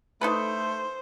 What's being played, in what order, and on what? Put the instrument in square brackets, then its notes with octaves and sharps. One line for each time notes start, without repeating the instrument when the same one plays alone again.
[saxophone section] A3 [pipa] D#4 A4 B4 [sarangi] C5